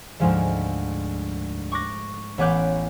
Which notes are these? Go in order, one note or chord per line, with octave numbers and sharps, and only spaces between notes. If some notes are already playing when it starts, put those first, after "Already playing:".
D2 G#2 F3 G#3
C#6 D6 F#6 A#6
A1 B3 C#5 D6 F#6 G6